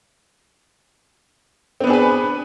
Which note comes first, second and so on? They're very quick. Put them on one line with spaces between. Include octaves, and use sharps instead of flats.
C4 B3 D4 G#4 B4